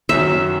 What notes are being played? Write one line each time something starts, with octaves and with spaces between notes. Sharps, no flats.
F#2 D#3 F#3 E5